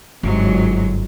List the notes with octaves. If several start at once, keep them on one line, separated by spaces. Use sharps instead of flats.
G1 G#2 C3 F#3